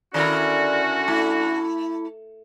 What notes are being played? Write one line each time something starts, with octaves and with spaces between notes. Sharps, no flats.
D3 D#3 C#4 E4 F#4 A#4 D5
A3 E4